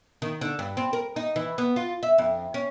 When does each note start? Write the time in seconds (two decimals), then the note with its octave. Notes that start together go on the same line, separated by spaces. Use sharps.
0.22 D#3
0.41 D3
0.59 G2
0.77 C4
0.93 A#4
1.16 D#4
1.36 E3
1.58 B3
1.76 F4
2.03 E5
2.18 F2
2.54 C#4